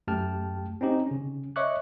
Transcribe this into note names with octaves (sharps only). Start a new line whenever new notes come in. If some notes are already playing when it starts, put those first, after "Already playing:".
F#2 A3 G4 G5 A5 F6
C4 C#4 D#4 G4
C#3 C#4
C#5 D#5 E5 C#6 D6 F#6